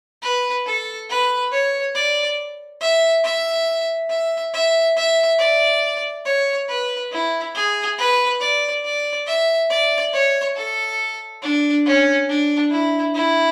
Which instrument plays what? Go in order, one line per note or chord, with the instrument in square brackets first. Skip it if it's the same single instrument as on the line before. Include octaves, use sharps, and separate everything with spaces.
[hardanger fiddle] B4
A4
B4
C#5
D5
E5
E5
E5
E5
E5
D5
C#5
B4
E4
G#4
B4
D5
D5
E5
D5
C#5
A4
D4
C#4
D4
E4
E4